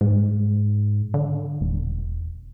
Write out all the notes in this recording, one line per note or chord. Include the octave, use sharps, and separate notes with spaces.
G#2
D3
E1